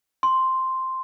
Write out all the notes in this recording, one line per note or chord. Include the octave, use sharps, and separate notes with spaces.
C6